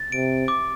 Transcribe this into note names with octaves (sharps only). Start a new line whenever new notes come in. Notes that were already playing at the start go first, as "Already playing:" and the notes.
Already playing: A6
C3 D7
D6